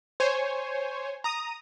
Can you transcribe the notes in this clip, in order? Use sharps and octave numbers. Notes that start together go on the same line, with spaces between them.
C5 C#5 G#5
A#5 D#6